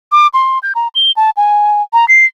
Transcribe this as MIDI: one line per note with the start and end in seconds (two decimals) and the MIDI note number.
0.12 0.27 86
0.34 0.59 84
0.63 0.73 91
0.75 0.88 82
0.95 1.11 103
1.16 1.30 81
1.37 1.82 80
1.93 2.08 82
2.08 2.25 96